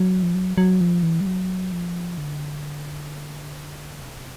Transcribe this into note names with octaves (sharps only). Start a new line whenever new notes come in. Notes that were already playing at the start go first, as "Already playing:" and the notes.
Already playing: F#3
F3
F#3
F#3
F3
E3
G3
F#3
F3
D3
C3